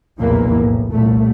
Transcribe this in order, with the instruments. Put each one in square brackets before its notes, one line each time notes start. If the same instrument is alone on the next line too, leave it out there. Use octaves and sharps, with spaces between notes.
[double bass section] F1 B1 E2 A#2 E3 A#3
A2
C2 A#2 A3